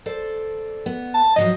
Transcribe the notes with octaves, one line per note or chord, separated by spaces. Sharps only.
A4 C5 D5
B3
A5
G#2 F3 F#3 D#5